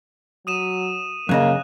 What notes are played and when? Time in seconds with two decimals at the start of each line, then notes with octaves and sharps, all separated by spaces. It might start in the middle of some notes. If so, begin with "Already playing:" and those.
0.47 F#3 D#6 D#7 E7
1.29 F#2 C#3 A#3 D#5 F#6